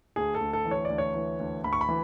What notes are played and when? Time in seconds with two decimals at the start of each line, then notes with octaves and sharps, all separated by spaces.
0.16 D2 G#4
0.35 A4
0.41 D2
0.53 A4
0.65 E3
0.71 C#5
0.85 D2 D5
0.98 C#5
1.14 E3
1.39 D2
1.64 D2 B5
1.73 C#6
1.81 B5
1.89 E3